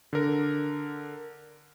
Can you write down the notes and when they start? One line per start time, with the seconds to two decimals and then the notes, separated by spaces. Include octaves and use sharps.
0.13 D3 A#4